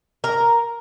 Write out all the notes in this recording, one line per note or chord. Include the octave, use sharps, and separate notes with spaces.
A#4